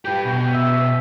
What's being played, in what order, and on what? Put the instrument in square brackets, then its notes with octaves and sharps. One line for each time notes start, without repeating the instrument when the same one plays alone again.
[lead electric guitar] G4 B4 [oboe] G5
[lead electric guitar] B2
[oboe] E5